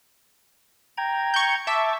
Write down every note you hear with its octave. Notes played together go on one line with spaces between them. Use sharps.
G5 A#5 G#6
C#6 G6
E5 A5 C#6 D6